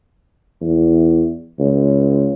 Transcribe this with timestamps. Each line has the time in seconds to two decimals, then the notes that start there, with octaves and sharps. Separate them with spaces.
0.61 E2
1.59 C#2